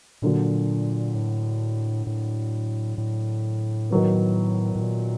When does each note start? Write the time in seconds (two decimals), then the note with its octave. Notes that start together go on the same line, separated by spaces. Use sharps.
0.22 A#2 D3 F#3 A#3 D4 F#4
1.15 A2
2.07 A2
2.98 A2
3.90 D#3 F#3 B3
4.76 A2
4.82 A#2